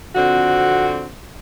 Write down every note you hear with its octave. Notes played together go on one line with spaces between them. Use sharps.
F2 D3 C4 F#4